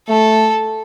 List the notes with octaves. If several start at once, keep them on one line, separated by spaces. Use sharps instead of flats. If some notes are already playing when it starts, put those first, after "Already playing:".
A3 A4